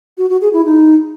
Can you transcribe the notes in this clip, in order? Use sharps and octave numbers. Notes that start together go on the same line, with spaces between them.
F#4
F#4
G#4
E4
D#4